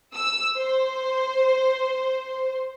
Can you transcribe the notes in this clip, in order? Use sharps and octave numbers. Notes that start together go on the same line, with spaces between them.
E6
C5